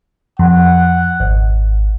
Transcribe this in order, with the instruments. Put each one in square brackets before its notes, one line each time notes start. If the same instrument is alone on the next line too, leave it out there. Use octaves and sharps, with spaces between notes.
[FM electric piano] F2 [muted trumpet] F#5
[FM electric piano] G#1